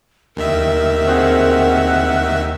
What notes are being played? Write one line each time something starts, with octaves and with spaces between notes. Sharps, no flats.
D#2 D#3 A#4 E5
C4 F#4 G#4 F#5